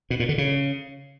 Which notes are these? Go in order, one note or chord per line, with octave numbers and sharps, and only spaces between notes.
B2
A#2
D3
C#3